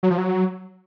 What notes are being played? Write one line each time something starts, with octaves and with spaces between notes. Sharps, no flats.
F#3
F3
F#3